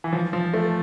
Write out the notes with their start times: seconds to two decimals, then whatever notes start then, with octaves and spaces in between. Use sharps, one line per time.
0.04 E3
0.13 F3
0.33 F3
0.54 A3